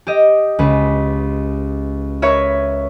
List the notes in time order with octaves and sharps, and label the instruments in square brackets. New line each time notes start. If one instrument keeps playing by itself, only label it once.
[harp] G4 D#5
C#2 B4
A#4 B4 C#5 E5